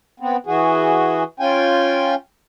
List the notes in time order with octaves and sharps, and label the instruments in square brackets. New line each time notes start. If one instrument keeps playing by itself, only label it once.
[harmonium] B3 C4
E3 F#4 G#4
C#4 F4 G5 G#5